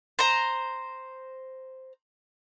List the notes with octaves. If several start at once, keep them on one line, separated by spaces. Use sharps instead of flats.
C5 A#5